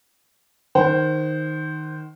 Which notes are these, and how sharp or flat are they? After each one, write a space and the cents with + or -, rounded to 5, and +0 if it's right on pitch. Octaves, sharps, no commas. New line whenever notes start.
D#3 +0 C5 +0 F#5 +45